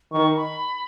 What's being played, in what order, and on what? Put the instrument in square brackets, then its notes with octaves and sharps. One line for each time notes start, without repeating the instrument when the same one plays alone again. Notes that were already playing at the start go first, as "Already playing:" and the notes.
[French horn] D#3 [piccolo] C#6
[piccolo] B5